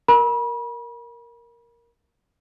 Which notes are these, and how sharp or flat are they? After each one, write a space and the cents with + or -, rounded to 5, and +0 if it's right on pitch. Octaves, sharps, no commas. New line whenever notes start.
A#4 +0 B5 -40